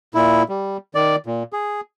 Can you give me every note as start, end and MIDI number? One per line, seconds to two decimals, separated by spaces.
0.15 0.43 46
0.15 0.43 64
0.49 0.77 55
0.95 1.16 51
0.95 1.16 74
1.26 1.43 46
1.53 1.81 68